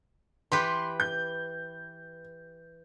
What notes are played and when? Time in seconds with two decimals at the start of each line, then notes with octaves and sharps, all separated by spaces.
0.52 E3 G4 B4 C6
1.00 G6